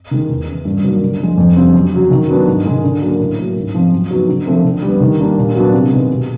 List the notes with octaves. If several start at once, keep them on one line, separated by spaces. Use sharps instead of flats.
D#3 G#3
E2
C#3 E3
G2
D#3 F#3 A#3 C#4
D3
F3 G#3
F2
D3 G3 C4
F#2
C#3 F#3
D#3
F#3 B3 D4
G#2
D#3 G#3
D3
F#3 A#3 C#4
A2
F#3 A#3 C#4
G#2
F3 G#3 C4
F#2
C#3 F#3 B3 D#4
D3
F3 A3 C4
D3
G3
B3
D#3
G3 A#3 D4
A#2
F#3 B3 D4
C3
D#3 G#3 B3
B2